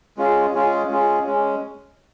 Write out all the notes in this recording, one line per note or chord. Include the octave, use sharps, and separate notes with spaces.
G#3 C#4 F4 G#4
G#3 C#4 F4 G#4
G#3 C#4 F4 G#4
G#3 C#4